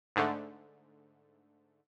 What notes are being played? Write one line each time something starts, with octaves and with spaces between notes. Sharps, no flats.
G#2 D3 A3